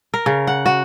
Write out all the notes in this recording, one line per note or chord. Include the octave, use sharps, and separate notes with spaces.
A#4
C#3
F#5
F#4